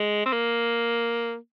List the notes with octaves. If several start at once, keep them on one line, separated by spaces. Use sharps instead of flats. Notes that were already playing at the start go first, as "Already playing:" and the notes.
Already playing: G#3
C4
A#3